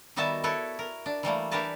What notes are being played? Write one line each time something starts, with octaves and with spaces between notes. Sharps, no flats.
D#3 G3 B3 F#4 E5 A5
E4 A4 B4 C#5
A#4
D4
E3 G3 A3 A#3
E3 D4 G4 A#4 B4 A5